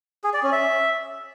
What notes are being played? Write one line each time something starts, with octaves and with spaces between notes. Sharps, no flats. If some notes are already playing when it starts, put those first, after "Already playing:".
G#4
D5
C#4
E5